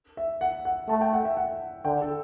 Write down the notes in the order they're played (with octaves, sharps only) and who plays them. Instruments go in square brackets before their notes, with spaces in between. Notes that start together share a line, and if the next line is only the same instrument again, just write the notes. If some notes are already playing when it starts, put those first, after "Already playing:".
[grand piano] E5
F#5
F#5
[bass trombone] A3 [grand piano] A5
[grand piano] G5
F#5
E5
F#5
[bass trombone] D3 [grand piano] G5
[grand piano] A4